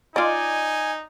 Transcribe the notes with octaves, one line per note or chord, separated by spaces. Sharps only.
D#4 F4 D5 D#5 G#5